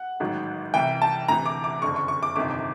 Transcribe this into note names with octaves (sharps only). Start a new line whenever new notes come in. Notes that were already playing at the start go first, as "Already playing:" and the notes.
Already playing: F#5
A1 G#2 D#3 F#3
C2 C3 E3 G5
A5
D2 C3 E3 A#5
D6
D6
F#1 F2 D3 C#6
C#6
C#6
D6
G1 F2 C3 D#3 D6